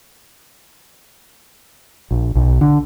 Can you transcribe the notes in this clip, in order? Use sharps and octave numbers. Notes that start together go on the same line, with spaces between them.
A#1
B1
D3